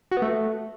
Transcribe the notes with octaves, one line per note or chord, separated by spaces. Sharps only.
F#4
B3
A3